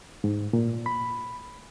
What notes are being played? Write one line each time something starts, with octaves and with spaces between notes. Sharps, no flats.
G#2
A#2
B5